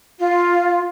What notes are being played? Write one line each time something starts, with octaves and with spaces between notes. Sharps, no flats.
F4